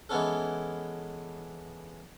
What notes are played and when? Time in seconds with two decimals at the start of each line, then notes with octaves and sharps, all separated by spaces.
0.09 E3 G#3 B3 C#4 A4